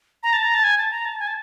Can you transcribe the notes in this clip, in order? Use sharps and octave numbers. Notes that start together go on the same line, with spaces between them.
A#5
A5
A#5
A5
G#5
A5
A#5
A5
G#5
A5